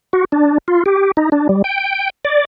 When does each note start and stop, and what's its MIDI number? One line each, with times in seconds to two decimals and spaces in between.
0.13 0.25 66
0.32 0.58 62
0.68 0.83 65
0.86 1.11 67
1.17 1.29 63
1.32 1.47 62
1.49 1.62 55
1.64 2.10 79
2.25 2.45 74